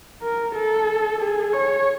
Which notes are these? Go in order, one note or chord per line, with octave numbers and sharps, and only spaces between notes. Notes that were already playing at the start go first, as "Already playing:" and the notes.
A#4
A4
G#4
C#5